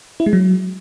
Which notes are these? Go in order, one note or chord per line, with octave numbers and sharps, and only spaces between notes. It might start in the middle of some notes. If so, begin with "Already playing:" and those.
E4
G#3
F#3